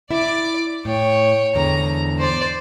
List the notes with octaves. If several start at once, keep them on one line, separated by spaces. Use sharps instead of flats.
E4 D5 E5 D6
A2 C#5 G5
E2 G#2 D3 A#5
C5 D5